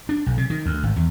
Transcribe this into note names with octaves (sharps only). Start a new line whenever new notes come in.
D4
B1
C3
D#3
D2
G#1
E2